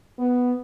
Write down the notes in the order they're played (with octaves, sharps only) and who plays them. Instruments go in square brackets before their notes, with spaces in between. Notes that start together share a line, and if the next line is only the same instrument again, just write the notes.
[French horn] B3